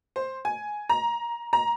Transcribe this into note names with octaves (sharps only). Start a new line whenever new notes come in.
C5
G#5
A#5
A#5